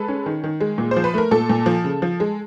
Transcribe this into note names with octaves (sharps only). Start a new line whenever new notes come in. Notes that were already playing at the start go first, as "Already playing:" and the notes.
Already playing: G#3 A4 B4
C#4
D#3
D#3
G#3
A#2
C5
F3
B4
A3 A#4
A#2 A4
A#2
F3
C#3
F3
G#3